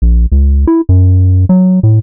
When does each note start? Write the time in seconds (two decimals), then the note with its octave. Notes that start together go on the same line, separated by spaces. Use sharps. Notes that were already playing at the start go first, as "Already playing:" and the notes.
0.02 A#1
0.32 C#2
0.67 E4
0.89 F#2
1.49 F#3
1.83 A2